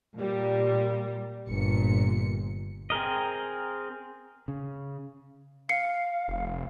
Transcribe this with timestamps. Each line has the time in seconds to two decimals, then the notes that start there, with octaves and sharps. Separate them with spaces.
0.17 A#2 G3
1.48 G1 A#2 C#7
2.90 C4 G#4 A#4 D#5
4.48 C#3
5.69 F5 C7 C#7
6.28 F1